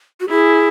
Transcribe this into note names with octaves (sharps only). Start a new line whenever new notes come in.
F#4
E4 G#4